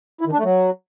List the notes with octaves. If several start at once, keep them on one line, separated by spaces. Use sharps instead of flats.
E4
D#3
D4
A3
F#3